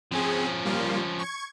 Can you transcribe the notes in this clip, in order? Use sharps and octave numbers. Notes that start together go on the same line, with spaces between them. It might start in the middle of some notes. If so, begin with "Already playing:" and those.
F3 C4 C#4 G#4
G3 A#3 F4
C#6 G#6